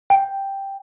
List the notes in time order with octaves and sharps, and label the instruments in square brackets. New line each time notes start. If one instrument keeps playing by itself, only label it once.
[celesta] G5